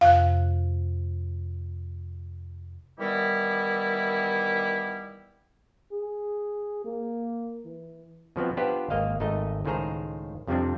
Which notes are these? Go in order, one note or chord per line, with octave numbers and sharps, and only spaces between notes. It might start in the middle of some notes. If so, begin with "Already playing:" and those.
F2 C3 F5 F#6
D#3 E3 G3 B3 E4 G4
G#4
A#3
E3
B2 F3 B3 C4
B3 D4 F4 G4 B4 C5
G#1 A#3 D#5 F5
G#1 A3 D#4 D#5
C#2 A2 D#3 G#4 C5 A#5
F2 C3 F3 G3 C4 D4